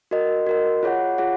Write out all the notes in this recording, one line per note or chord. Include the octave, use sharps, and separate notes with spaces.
F#4 A#4 D#5
F#4 A#4 D#5
F4 G#4 C#5 F#5
F4 G#4 C#5 F#5